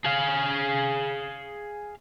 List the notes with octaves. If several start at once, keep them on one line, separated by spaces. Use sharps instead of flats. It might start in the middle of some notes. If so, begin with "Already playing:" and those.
G#4 F5